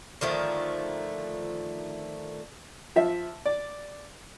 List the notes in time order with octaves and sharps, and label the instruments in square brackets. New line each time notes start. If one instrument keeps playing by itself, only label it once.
[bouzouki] D3 D#3 F3 A3
[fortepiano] F3 E5
D5